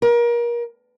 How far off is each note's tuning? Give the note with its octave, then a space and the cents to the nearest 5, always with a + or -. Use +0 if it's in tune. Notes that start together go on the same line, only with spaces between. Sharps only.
A#4 +30